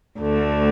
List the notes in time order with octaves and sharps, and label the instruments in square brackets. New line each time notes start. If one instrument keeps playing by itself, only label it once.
[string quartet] D2 D3 A3